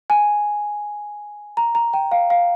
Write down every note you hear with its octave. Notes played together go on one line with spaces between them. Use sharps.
G#5
A#5
A#5
G5
F5
F5